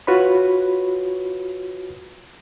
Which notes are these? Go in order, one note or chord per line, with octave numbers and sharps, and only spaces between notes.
F4 F#4 B4 C#5 B5